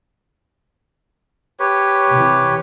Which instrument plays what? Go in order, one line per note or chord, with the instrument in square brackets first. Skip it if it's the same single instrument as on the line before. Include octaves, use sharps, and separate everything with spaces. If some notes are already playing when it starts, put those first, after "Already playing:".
[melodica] G4 B4 C#5
[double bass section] C3 E3